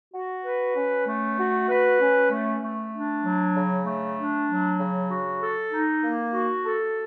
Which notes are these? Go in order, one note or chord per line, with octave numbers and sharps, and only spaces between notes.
F#4
B4
C#4
A3
F#4
B4
C#4
A3
A3
D4
F#3
C#3
A3
D4
F#3
C#3
F#4
A4
D#4
A#3
F#4
A4